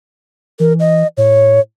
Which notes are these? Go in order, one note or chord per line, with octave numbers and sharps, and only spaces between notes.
E3 A#4
D#5
A2 C#5